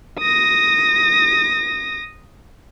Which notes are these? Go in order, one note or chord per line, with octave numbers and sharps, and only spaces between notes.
D#6 A#6